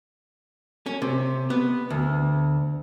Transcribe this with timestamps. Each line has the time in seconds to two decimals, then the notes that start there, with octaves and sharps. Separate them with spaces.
0.86 C#4
1.02 C3
1.50 B3
1.90 D2